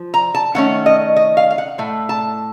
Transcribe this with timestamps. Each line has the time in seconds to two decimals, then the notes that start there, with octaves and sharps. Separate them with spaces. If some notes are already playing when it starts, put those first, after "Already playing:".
Already playing: F3
0.14 A#5
0.35 A5
0.54 D#3 A3 C#4 F#5
0.86 D#5
1.16 D#5
1.37 F5
1.50 F5
1.58 F#5
1.78 A2 A3
2.09 A5